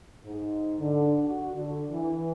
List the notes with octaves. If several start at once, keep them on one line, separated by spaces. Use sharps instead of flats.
G#2
D3
F#4
D3
E3